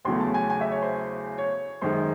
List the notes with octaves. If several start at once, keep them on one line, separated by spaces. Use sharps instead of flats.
E2 C#3 F#3 A3 C6
A5
G#5
G#5
E5
C#5
C5
C#5
F#2 D#3 G#3 C5